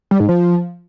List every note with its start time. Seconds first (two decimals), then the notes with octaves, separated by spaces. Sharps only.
0.11 G3
0.20 G#2
0.29 F3